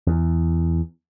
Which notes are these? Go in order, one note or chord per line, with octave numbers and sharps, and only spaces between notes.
E2